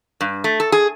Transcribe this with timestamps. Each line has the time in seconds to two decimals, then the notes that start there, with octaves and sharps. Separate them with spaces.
0.21 G2
0.44 A3
0.60 A4
0.72 G#4